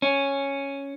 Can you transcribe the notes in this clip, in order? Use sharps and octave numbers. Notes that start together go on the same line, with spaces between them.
C#4